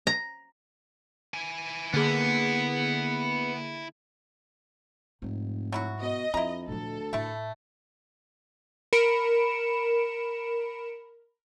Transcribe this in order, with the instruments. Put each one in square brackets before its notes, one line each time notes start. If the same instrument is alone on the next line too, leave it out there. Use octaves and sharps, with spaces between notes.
[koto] A#5
[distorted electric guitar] E4 G#5
[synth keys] D3 A#3 G#4 [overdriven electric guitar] B3
[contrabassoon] F1 [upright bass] G#2
[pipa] F#3 E4 F#4
[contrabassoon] B2 [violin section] D#5
[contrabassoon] F2 [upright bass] D4 [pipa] E4 A#5
[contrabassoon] D2 [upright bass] A#2 F3 [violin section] A4
[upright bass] A2 [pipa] A3 E4
[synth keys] A#4 B5 C#7 D7 E7